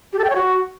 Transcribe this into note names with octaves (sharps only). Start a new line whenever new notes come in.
G4
A4
G5
C#5
F#4